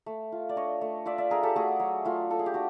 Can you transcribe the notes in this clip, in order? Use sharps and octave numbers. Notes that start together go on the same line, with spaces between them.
A3
F4
D5
D4 C#5 D#5
A3
F4 D5 E5
D5 E5
D4 G#4 A#4
G4 A4
A3 F#4 G#4
F#3
A3 F4
F4 A4
G#4
G4
D4 F#4